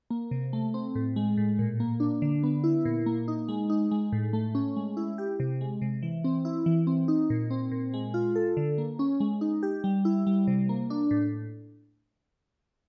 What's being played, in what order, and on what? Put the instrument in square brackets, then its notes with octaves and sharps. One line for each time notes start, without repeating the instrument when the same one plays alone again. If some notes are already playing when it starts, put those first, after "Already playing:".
[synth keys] A#3
C3
A3
C4
A2
G#3
A2
A#2
A#3
D4
D3
B3
E4
A#2
A#3
D#4
G#3
D#4
G#3
A2
A3
C#4
G#3
E4
G4
C3
G#3
C3
E3
C4
E4
E3
C4
D#4
A#2
C4
A#2
G#3
F4
A4
D3
A#3
C#4
G#3
D#4
G4
G3
E4
G3
C3
A#3
D4
A2